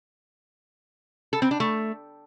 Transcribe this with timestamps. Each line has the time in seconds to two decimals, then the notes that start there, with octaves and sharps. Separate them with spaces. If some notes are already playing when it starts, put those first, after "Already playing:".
1.33 A4
1.42 C4
1.51 D4
1.60 A3